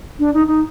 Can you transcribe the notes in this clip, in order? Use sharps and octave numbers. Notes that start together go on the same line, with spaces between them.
D4
D#4
D#4